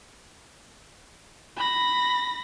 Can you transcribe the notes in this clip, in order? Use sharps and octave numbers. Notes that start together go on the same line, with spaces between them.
B5 A#6